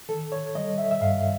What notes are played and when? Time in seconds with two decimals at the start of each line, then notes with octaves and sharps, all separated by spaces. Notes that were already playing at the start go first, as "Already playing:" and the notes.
0.08 D#3 A4
0.32 C#5
0.55 G3 D#5
0.78 E5
0.91 E5
1.01 G2 F5